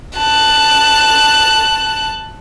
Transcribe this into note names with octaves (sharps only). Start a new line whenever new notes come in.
A5 F#6